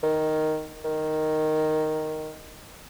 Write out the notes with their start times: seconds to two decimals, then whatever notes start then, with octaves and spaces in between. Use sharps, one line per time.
0.03 D#3
0.85 D#3